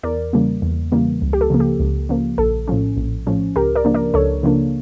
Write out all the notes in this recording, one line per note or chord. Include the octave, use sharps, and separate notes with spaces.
E2 A#4 D5
C#3 E3 G3 A#3
E2
C#3 E3 G3 A#3
C#2
G4
A4
C#3 F3 A#3
G4
C#2
C#3 F3 A#3
A#1 A4
A2 F3 C#4
A#1
A2 F3 C#4
C#2 G4 A#4
A#4 D5
C#3 F3 A#3 D4
A#4 D5
C#2 A4 C#5
C#3 F3 A#3 D4